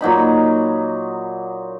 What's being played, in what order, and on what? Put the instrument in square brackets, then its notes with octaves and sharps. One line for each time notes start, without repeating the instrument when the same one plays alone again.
[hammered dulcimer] A#2 F#3 D#4 B5